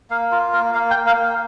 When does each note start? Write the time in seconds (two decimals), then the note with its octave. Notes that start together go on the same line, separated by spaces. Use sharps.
0.10 A#3 F5
0.32 F4 A#4
0.53 A#3 A#4
0.74 A#3 F5
0.90 G5
0.96 A#3
1.06 F5
1.17 A#3